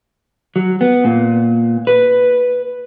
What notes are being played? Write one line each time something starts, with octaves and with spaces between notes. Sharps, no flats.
F#3
B3
A#2
B4